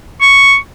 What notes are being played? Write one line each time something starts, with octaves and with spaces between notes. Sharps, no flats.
C#6